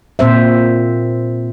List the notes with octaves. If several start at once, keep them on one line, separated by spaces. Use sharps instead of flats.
A#2 C4 C5 E5